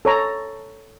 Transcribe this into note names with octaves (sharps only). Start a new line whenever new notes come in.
A4 C#5 A#5